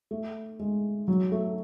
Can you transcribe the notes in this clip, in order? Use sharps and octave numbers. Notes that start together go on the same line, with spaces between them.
A3
G#3
F#3
A3